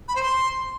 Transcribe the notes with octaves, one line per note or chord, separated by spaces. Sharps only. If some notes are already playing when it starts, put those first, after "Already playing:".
B5
C5
C6